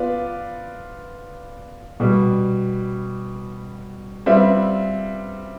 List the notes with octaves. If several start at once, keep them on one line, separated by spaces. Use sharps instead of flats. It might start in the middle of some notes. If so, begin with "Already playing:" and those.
Already playing: B3 F4 B4 D5
B2 G3 B3
G3 C4 F4 B4 E5